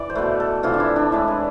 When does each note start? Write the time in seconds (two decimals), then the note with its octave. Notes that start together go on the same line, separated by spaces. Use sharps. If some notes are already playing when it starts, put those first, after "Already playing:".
Already playing: E3 D5
0.10 C5
0.15 B2 A3 B4
0.40 A4
0.63 C3 E3 A3 F4
0.74 D4
0.80 E4
0.96 D4
1.12 A2 G#3 E4
1.28 B4